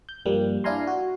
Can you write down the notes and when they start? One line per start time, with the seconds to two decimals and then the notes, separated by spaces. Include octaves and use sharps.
0.09 G6
0.26 G2 F3 G3 A#3
0.64 D4 E4 F5 G#5 A#5 C6
0.87 F#4